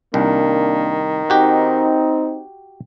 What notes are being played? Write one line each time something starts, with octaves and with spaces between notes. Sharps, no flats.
C2 D#3 A#3 D4
C4 D#4 F#4 G4